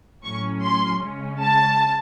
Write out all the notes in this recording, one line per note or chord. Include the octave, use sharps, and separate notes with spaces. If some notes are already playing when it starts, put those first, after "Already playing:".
A2 F#3 C#4 C#6
C6
C#3 G#3 C#4
A5